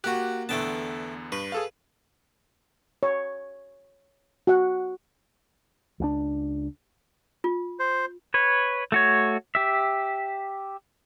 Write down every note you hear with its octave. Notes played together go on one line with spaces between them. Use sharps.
A#3 F#4 G4 F#6
E2 D3 A3 B3 G5 A5
G2 B4
G#4 A4 F5
C#5
F#4 F#5
C#2 F#3 D4
F4
C5
B4 C#5
A3 F#4 C#5
G4 E5